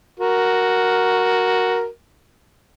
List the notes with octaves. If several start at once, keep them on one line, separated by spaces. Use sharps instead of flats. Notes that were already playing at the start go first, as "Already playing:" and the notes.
F#4 A#4